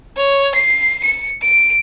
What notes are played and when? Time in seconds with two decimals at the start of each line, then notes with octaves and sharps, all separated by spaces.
0.17 C#5
0.55 C7
1.03 C#7
1.42 D7